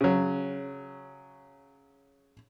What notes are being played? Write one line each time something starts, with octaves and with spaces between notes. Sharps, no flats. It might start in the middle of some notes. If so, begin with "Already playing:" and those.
C#3 F#3